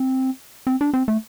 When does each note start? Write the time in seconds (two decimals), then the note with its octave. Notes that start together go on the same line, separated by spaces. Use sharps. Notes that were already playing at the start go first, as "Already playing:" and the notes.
Already playing: C4
0.67 C4
0.81 D4
0.94 C4
1.08 A3